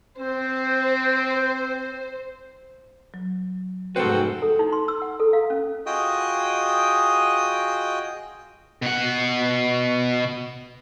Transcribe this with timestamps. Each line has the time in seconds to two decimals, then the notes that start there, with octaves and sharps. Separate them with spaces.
0.18 C4 C5
3.14 F#3
3.96 F1 G#2 C4 F#4 A4 B4
4.42 A4
4.59 D#4
4.72 C6
4.88 E6
5.02 F#5
5.20 A4
5.33 F5
5.50 C#4
5.86 F4 F#4 G#4 D#5 G5 D#6
8.82 B2 F#5